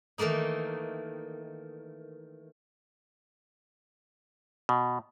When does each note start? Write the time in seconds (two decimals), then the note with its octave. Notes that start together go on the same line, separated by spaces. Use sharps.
0.18 D#3 E3 A3 A#3 D#4
4.69 B2